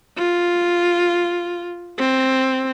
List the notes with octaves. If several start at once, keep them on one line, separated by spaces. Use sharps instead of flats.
F4
C4